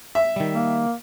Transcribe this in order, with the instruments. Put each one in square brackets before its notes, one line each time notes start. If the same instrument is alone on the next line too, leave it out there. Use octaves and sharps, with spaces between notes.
[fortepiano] E5
[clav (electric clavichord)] D#3 G3
[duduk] A#3